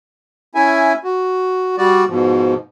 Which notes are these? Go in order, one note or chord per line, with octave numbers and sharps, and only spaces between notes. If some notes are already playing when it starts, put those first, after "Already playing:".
C#4 E4 E5 G#5
F#4
G3 F#4 D5
G#2 B2 F3